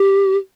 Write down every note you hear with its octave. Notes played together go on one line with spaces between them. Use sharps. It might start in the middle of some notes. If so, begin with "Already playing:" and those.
Already playing: G4